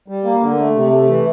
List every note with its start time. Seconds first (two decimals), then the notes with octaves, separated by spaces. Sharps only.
0.08 G3
0.25 A#3
0.41 D3
0.58 A3
0.75 C3
0.92 A3
1.09 E3